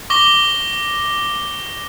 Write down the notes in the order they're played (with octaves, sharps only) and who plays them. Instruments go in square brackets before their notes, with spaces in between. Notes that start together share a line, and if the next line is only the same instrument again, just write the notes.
[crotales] C#6 D6 A#6 G7